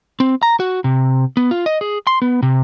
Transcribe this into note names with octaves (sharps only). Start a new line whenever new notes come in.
C4
A#5
F#4
C3
B3
F4
D#5
G#4
C6
B3
C3